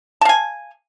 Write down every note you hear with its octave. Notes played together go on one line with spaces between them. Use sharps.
F5 G#5 A5